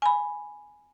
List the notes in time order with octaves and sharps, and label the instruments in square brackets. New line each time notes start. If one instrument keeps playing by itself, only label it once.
[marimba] G#5 B5